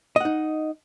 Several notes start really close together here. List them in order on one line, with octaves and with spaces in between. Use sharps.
D#5 F#5 D#4